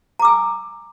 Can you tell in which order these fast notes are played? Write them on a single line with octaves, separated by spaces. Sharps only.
A#5 D6 E6 G#5